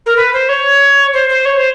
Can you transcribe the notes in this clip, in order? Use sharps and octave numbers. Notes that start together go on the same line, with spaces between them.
A#4
B4
C5
C#5
C5
C5
C#5
C5